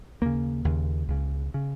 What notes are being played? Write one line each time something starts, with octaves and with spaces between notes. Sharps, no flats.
D#2 C#3 A#3
D#2 C#3
C#2 C#3
C#3